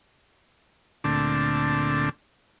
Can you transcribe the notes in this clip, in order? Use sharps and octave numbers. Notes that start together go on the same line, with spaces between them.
D2 A#2 D3 A3 C4 D4